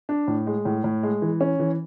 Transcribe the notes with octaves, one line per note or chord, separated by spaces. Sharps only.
D4
A2
G#3
A2
A2
G#3
E3
C#4
E3